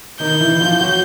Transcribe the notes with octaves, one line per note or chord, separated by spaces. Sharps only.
D#3 D#4 G6
E3 E4
F3 F4
F#3 F#4